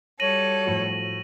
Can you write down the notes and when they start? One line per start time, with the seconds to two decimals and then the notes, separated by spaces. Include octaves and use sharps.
0.20 G3 F#4 A4 C#5 A#6 D#7 F#7
0.66 A2 F3 F#3